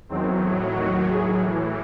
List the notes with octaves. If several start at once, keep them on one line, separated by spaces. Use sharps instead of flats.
E2 D#3 F#3 C4
A2 F#3
D#2 D#3 F#3 F#4
A2 F#3 G#4
A2 E3